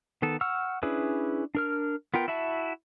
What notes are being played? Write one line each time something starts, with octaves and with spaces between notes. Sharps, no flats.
D#3 B3 A4
F#5 C#6 E6 F6
C#4 D4 E4 G#4 B4
D4 A#4 F6
B3 F4 A#4 G5
E4 F#4 E5 A5